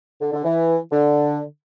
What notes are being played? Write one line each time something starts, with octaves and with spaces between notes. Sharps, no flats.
D3
D3
E3
D3